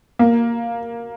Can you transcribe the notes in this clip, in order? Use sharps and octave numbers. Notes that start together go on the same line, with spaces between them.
A#3